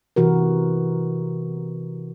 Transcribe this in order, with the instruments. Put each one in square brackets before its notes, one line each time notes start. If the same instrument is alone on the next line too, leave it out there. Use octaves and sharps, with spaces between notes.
[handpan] C3 E3 F#4 A#4